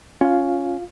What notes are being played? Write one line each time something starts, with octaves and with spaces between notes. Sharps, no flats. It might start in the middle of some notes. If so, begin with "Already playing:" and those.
C#4 F4 F5